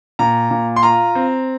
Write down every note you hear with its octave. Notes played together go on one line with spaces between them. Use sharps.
A#2 A#5
A#2
C6
F4 A#5
C4